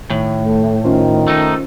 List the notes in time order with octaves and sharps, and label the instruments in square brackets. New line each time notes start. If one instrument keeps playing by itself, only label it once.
[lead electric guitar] A2 [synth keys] D#3
[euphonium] A3
[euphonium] D#3 [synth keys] C#4 F4 C5
[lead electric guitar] A3 D#4